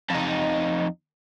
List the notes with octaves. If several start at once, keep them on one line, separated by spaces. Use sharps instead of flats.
F2 D#4